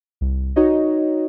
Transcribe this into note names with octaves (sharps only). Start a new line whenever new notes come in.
C2
D#4 F#4 C#5 D#5